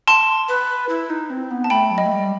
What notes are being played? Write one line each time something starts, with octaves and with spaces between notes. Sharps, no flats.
A5 C6
B4
E4
D#4
C4
B3
A5
A3 G5 B5
F#3
D#5
A3
G3